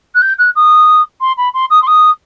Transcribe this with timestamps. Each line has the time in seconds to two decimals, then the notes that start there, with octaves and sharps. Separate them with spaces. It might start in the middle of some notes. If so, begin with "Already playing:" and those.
0.14 F#6
0.22 G6
0.38 F#6
0.55 D#6
1.20 C6
1.37 B5
1.53 C6
1.70 D#6
1.82 C6
1.87 D#6